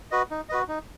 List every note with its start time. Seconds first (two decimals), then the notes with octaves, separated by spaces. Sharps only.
0.11 F#4 B4 D#5
0.31 D#4
0.49 F#4 B4 D#5
0.68 D#4